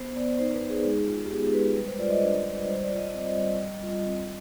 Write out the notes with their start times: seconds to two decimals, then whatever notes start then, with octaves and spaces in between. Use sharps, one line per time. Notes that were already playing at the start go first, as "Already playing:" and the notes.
Already playing: B3 C5
0.16 B3 D5
0.39 D#4 C5
0.54 B4
0.61 D#4
0.70 G#4
0.85 G#3
1.07 F4
1.26 G4
1.30 B3 G#4
1.53 G#3 B4
1.76 G3 B4
1.88 C5
1.99 F4 D5
2.10 D#5
2.22 D4
2.45 G3
2.67 G3 C5
2.83 D5
2.91 F4
2.98 D#5
3.13 C4 D#5
3.37 G3
3.59 G3
3.82 F4
4.06 C4